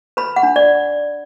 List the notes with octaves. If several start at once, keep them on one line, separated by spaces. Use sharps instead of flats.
B4 B5
F#5
D4
D5